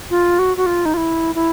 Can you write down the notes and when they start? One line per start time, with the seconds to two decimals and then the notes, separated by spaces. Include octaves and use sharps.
0.11 F4
0.39 F#4
0.57 F#4
0.66 F4
0.85 D#4
0.94 F4
0.97 E4
1.35 E4